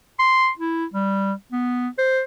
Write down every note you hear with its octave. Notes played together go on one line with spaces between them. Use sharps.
C6
E4
G3
B3
C5